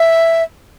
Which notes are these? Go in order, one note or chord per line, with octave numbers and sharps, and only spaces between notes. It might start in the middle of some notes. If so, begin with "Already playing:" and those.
Already playing: E5